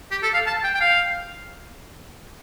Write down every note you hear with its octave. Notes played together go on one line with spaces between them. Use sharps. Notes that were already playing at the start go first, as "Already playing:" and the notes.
G4
A4
F5
A5
G5
G5
F5